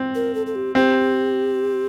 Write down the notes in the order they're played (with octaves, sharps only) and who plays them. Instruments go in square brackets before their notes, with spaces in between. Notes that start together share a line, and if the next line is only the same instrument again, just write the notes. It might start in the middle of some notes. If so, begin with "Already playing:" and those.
Already playing: [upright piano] C4
[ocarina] A#4
A4
A4
G4
[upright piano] C4 [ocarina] G4